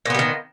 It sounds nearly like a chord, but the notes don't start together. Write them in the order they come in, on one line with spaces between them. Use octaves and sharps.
A#2 B3 G3 D#3